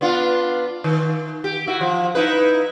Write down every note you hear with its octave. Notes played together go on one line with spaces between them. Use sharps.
B3 D4 F4
D#3
G4
E4 F#4
F3
D#4 E4 B4